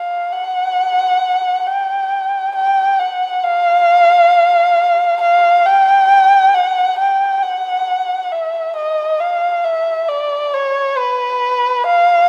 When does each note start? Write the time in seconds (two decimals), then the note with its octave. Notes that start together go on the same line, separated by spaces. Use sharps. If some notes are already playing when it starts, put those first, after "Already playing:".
Already playing: F5
0.33 F#5
1.66 G5
2.55 G5
2.99 F#5
3.44 F5
5.21 F5
5.66 G5
6.54 F#5
6.98 G5
7.43 F#5
8.32 E5
8.76 D#5
9.20 F5
9.65 E5
10.08 D5
10.54 C#5
10.98 B4
11.86 F5